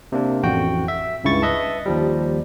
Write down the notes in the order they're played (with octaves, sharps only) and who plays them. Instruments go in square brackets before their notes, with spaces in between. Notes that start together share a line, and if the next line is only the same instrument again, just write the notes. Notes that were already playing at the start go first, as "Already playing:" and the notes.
[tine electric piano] C3 A#3 D4
A1 F2 F#4 G5
E5
C#2 G2 C#3 E4 C#6 A6
B4 D#5 E5 A5
D#2 F3 G3